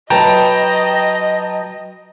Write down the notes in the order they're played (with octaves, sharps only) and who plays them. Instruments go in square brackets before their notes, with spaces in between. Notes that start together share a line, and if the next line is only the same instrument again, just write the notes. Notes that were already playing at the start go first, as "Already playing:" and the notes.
[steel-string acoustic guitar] F#3 B4 [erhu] D#5 [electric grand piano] G5 A5 A#5